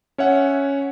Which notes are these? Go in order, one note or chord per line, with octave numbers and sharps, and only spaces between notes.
C#4 C#5 E5 F#5